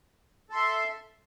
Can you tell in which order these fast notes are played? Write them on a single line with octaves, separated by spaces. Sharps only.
A4 C6 E5